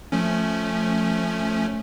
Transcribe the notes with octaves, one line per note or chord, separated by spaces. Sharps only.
F3 A3 C#4